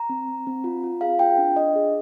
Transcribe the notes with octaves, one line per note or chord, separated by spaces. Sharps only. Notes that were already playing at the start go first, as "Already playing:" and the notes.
Already playing: A#5
C4
C4
C4
F4
F4
G#4 F5
F4 G5
D4
D4 D#5
G#4